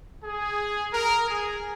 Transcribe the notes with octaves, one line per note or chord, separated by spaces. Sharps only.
G#4
A#4
G#4